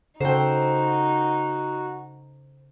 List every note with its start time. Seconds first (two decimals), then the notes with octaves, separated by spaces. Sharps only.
0.20 C#3 D#4 F#4 A4 C5 G5